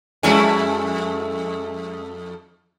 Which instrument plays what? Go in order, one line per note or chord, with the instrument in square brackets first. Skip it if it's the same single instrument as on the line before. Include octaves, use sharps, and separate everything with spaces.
[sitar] F2 A3 E4 [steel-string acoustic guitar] G#3 C#4 G#5